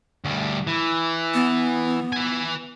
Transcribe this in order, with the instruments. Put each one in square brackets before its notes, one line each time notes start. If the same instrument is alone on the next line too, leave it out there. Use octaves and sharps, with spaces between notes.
[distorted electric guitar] D2 G3
E3
[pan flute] B3
[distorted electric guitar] B4 G#5